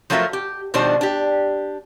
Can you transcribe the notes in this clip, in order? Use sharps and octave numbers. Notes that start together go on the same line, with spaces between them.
F3 F#3 A3 F4 A#4 E5
G4
B2 D#3 F3 G3 D4 C5
D4 G4